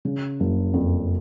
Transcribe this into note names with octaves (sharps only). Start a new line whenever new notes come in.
C#3
F#1
F2